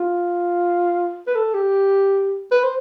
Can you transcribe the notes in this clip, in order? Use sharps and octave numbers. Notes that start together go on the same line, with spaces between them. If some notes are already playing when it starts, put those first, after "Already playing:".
Already playing: F4
B4
A4
G4
B4
C5